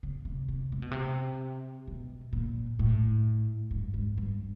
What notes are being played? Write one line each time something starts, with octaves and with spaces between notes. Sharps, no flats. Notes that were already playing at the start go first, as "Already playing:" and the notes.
C#3
C3
C3
C3
B2
C3
B2
A#2
A2
G2
G#2
G2